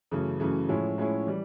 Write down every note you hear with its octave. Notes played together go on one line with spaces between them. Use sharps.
F#2 C#3 E3 A3
F#2 C#3 E3 A3
A2 F3 G#3 C#4 E4
A2 F3 G#3 C#4 E4
E3 G3